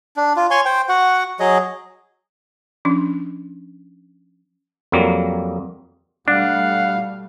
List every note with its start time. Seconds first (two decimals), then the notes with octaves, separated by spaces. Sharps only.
0.17 D4
0.37 F4
0.51 C#5 G#5 C6 C#6
0.65 C5 G5
0.89 F#4 F#5
1.40 F#3 G#4 D#5
2.85 F3 C#4 D4
4.92 F2 F#3 G3 A#3
6.28 B2 G3 A3 D4 F5 F#5